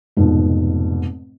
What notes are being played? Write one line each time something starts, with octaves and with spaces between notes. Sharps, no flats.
F1 F2 G#2 B2